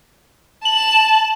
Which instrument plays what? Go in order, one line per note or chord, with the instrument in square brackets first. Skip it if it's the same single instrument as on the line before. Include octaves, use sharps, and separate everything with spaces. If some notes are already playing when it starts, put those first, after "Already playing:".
[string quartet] A5 [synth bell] F#7